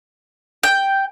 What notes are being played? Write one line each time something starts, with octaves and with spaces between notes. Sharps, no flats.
G5